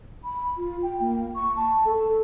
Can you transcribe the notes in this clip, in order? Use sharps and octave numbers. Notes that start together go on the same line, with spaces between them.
B5
F4
G5
A#3
C#6
A5
A4